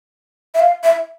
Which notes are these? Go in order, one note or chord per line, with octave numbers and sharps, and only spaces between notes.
E5
F5
E5